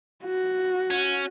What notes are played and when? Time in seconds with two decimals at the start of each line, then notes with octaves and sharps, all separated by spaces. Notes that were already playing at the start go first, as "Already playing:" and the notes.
0.25 F#4
0.90 C#4